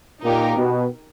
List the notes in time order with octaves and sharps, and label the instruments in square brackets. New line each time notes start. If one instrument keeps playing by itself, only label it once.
[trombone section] A#2 A#3 [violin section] D#4 G4 A#4
[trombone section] B2 B3